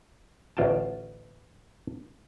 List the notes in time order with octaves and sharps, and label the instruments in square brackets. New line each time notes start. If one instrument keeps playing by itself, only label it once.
[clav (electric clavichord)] A1 D2 F4 G5 A5